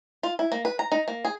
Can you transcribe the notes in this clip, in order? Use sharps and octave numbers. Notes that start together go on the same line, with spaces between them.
F4
E4
A#3
B4
A#5
D#4
A#3
G#4